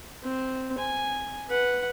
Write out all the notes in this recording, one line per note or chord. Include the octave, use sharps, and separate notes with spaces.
C4
G#5
B4 F#5